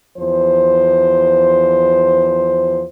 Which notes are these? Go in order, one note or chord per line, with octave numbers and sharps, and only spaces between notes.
E2 F3 C5